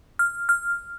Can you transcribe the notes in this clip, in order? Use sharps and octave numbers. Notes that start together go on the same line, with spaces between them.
F6
F6